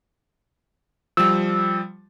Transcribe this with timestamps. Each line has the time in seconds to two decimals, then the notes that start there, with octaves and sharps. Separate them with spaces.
1.17 F3 G3 E6